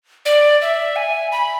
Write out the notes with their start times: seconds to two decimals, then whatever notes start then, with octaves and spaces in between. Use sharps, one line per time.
0.26 D5
0.62 E5
0.96 G#5
1.32 B5